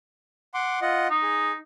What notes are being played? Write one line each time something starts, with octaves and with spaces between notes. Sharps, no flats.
F#5 C6 D6
F4 D#5 F#5
D#4
G#4